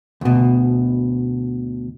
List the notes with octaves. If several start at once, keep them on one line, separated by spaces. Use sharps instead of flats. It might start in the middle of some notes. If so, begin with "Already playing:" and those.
D2 B2